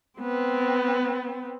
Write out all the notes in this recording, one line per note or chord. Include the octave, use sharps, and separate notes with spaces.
B3 C4